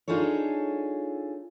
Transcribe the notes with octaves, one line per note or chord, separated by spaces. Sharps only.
D4 D#4 F4 G#4 A4 C#5